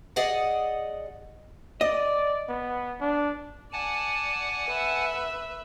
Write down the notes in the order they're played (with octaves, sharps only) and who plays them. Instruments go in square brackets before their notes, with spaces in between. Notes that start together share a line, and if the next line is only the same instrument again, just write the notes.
[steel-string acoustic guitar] G#4 D5 D#5 F#5
[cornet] D5 [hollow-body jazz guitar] D#5
[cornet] B3
D4
[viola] D5 [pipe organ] F#5 G#5 A5
[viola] B4 E5